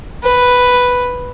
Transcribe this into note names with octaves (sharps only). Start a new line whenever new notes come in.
B4